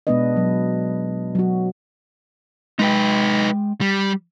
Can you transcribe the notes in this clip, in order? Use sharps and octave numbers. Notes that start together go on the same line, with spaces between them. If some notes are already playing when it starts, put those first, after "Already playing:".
B2 G#3 B3 D4 B4 D#5
F#3
F#3 F#4
G#3 D#4 B4 G5
G3